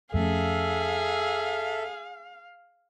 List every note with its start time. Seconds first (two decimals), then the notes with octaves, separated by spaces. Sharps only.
0.14 F2 A3 C#4 G#4 A4 E5 F5